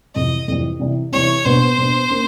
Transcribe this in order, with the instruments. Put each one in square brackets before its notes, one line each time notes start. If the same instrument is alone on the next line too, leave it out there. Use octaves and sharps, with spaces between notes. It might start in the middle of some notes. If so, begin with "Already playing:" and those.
[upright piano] F2 C3 E3 G3 [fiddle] D#5
[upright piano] F2 C3 E3 G3
C3 E3 G3
[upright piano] C3 E3 G3 [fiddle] C#5
[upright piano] B2 G3 B3 D4 [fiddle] C5
[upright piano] B2 G3 B3 D4
A#3 C#4